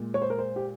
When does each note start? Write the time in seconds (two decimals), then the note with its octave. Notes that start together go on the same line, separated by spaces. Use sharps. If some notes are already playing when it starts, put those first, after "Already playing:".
Already playing: A#2 G#3
0.14 C#5
0.22 C5
0.30 A#4
0.38 C5
0.56 G4